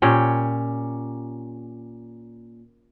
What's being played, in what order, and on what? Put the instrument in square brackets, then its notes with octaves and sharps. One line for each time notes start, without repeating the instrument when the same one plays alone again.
[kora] A#2 C#4 G4 G5